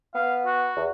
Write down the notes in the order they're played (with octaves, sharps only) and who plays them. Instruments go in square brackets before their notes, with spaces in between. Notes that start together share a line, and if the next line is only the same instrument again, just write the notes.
[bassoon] B3 [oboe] F5
[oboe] F#4
[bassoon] E2